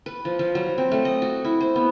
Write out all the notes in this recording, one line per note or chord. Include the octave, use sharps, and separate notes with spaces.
B4
F3
F3
F#3
C4
A3
D#5
F#4
E4
C5
B3